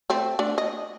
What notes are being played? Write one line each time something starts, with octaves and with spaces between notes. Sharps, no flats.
A3 C4
A3 D4
D#5